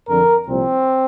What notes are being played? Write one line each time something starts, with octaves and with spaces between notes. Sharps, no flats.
F2 D3 F3 A#4
C2 A#2 F3 C4